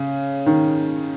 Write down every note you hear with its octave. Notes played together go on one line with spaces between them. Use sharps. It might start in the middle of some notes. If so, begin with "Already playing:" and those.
Already playing: C#3
D#3